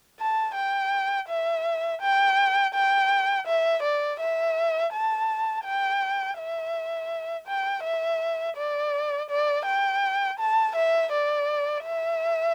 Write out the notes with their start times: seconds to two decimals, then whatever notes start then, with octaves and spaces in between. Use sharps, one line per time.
0.20 A5
0.55 G5
1.29 E5
2.02 G5
2.75 G5
3.47 E5
3.83 D5
4.20 E5
4.93 A5
5.65 G5
6.38 E5
7.47 G5
7.84 E5
8.57 D5
9.30 D5
9.66 G5
10.40 A5
10.76 E5
11.12 D5
11.85 E5